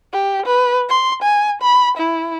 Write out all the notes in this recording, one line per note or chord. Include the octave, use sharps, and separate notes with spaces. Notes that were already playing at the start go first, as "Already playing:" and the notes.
G4
B4
C6
G#5
B5
E4